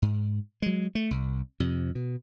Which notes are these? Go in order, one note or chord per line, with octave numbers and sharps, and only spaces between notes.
G#2
F#3 G#3
A3
C2
F2 C3
B2